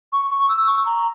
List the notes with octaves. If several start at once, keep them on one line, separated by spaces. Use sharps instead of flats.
C#6
C#6
E6
C#6
A#5